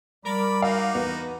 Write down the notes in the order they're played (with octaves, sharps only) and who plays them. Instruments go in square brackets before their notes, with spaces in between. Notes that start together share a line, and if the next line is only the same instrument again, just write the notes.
[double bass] G3 [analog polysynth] A#4 D6 [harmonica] D5 B5
[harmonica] D#4 F#4 [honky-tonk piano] F5
[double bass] E2 [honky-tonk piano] B3